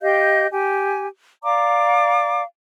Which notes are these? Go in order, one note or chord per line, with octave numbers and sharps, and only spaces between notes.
G4 D#5 F5 G6
G4 G#5
D5 F5 A#5 D6